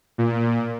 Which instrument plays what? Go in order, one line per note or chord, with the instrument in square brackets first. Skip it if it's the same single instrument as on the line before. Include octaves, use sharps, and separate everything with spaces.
[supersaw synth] A#2